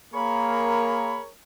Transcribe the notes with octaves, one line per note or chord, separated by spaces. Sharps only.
A#3 G#4 A#4 C#5 B5